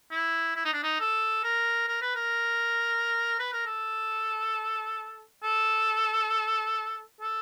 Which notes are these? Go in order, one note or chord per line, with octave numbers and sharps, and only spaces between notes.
E4
E4
D#4
D4
D#4
A4
A#4
A#4
B4
A#4
B4
A#4
A4
A4
A4